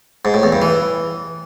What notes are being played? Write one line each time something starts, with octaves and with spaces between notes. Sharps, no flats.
G#2
A2
E2
G2
E3